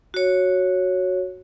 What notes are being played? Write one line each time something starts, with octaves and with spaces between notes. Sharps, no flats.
F#4 C#5